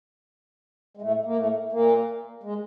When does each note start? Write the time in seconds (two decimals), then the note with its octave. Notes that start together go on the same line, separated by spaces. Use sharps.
0.97 G#3
1.02 A2 A3
1.25 A#3
1.37 A2 A3
1.72 A#2 A#3
2.43 G#3